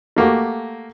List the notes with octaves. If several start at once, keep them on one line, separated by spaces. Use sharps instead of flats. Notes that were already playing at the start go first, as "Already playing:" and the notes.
A3 A#3 F#4 G4